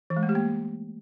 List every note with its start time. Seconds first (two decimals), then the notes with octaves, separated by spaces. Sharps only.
0.10 E3
0.17 G#3
0.23 A3
0.29 G4
0.35 A#3